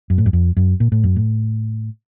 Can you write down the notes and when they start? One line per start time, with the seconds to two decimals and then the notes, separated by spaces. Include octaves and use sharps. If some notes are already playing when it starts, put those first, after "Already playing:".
0.10 F#2
0.18 A2
0.26 F#2
0.33 F2
0.57 F#2
0.80 A#2
0.92 A2
1.04 F#2
1.16 A2